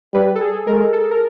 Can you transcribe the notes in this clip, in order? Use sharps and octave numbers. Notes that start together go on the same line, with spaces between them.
G3 B4
A4
G#4
G#3 A#4
A4
A#4